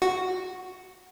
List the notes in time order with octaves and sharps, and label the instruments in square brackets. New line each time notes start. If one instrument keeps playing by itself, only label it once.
[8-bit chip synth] F#4